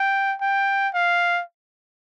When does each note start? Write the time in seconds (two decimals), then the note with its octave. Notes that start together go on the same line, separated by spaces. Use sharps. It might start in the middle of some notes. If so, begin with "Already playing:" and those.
Already playing: G5
0.41 G5
0.94 F5